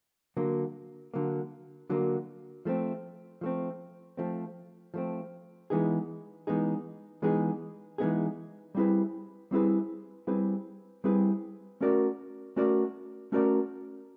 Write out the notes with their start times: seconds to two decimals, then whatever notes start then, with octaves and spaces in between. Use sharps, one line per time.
0.37 D3 F#3 A#3
1.14 D3 F#3 A#3
1.90 D3 F#3 A#3
2.65 F3 A3 C4
3.41 F3 A3 C4
4.17 F3 A3 C4
4.94 F3 A3 C4
5.70 E3 G#3 B3 D#4 G#4
6.47 E3 G#3 B3 D#4 G#4
7.22 E3 G#3 B3 D#4 G#4
7.98 E3 G#3 B3 D#4 G#4
8.75 G3 C4 E4 G#4 B4
9.51 G3 C4 E4 G#4 B4
10.27 G3 C4 E4 G#4 B4
11.04 G3 C4 E4 G#4 B4
11.81 A3 C#4 F#4 A#4 D5
12.56 A3 C#4 F#4 A#4 D5
13.32 A3 C#4 F#4 A#4 D5